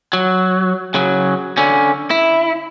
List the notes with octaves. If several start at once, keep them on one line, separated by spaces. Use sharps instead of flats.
F#3
C#3 F#3
D3 C#4
E4